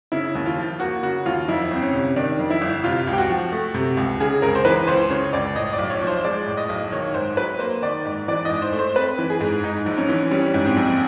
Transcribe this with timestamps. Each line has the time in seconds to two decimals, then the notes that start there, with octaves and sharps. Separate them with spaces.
0.12 C#3 E4
0.35 D#2
0.46 F4
0.58 F3
0.80 A#3 F#4
1.03 C#3 F#4
1.26 D#2 F4
1.48 F2 E4
1.71 G1 C4
1.82 C#4
1.93 C3
2.16 D#3 D4
2.39 F2
2.50 E4
2.61 G1
2.84 C3 F4
3.07 C#2
3.13 G4
3.18 F#4
3.30 F3
3.52 A3
3.74 C3
3.97 C#2
4.20 C#3 G#4
4.42 C#2 A#4
4.55 C5
4.65 E3 B4
4.88 C#2 C5
5.10 C#3 C#5
5.33 C#2 D5
5.56 A2 D#5
5.73 D5
5.78 B1
5.90 C#5
6.01 F3
6.07 C5
6.24 G#3 D5
6.46 A2
6.57 D#5
6.69 B1
6.92 D#3 C#5
7.14 G#2 C5
7.37 F#3 B4
7.59 A#3 C5
7.82 D#3 D5
8.05 G#2
8.28 E3 D5
8.45 G#2 D#5
8.62 C5
8.72 A3
8.79 C5
8.96 C4 B4
9.19 E3
9.30 G#4
9.40 G#2
9.64 G#2 D#4
9.86 A#1
9.98 C#4
10.09 E3
10.31 G3 C#4
10.54 G#2
10.66 C4
10.77 A#1